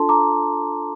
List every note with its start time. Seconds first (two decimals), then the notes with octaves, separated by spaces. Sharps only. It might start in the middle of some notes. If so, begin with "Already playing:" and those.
Already playing: D4 F4 A4 A5 C6
0.09 A#5 D6